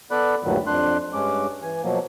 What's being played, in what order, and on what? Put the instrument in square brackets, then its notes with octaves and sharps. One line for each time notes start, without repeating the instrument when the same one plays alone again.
[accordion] B3 A4 D5 B5 F#6
D2 G2 A#2 D#3 F#3
F2 D4 C6 F#6
G2 G#3 C#4 D6
E3 G#5
B2 F3 F#3 A#3